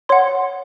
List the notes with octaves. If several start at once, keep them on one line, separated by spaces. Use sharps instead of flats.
C#5 F#5 C6